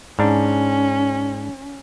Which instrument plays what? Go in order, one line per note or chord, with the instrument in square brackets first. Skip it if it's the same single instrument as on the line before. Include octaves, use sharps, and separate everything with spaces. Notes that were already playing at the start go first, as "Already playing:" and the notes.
[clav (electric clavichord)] G#2 D4 [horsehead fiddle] C#4